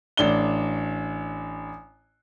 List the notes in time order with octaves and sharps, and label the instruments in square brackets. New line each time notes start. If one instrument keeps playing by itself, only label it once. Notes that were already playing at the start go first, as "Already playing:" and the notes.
[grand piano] A1 D4 G7